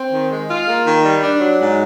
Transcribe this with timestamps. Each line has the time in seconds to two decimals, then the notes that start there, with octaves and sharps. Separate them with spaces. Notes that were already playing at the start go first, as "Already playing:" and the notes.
Already playing: C4
0.11 D#3
0.30 G#3
0.49 F4
0.67 A#3
0.85 D#3
1.04 G3
1.22 D4
1.41 F#3
1.59 G#2